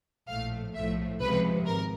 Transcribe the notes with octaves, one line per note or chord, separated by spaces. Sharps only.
A#1 A2 F3 A3 F5
B1 A2 F3 A3 E5
C#2 C3 F3 G#3 B4
G#1 A#4